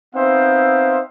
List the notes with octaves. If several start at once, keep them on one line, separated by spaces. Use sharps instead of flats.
B3 C4 D#4 C5 E5 F5